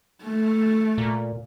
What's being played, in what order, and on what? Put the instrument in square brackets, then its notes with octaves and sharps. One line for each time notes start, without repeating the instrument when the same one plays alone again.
[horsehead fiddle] A3
[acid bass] A#2